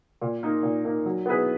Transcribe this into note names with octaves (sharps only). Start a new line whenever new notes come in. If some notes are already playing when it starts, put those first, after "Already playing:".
A#2
A#3 D#4 A#4
A#2
A#3 D#4 A#4
F#3
B3 E4 G#4 B4